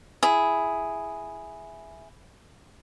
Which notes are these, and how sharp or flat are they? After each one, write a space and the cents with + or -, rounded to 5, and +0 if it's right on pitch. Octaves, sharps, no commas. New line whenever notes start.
E4 +0 G#4 +0